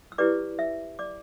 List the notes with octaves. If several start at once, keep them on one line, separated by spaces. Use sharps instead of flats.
E6
E4 G4 B4 D5 D6
E5 E6
D5 D6